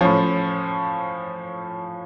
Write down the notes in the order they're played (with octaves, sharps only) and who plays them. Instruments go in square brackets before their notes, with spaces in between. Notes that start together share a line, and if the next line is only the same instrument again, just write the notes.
[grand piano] A2 F3 C#4